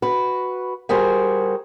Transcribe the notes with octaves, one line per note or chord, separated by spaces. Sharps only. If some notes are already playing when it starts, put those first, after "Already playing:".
F#4 B4
G3 F#4 G#4 A#4 C5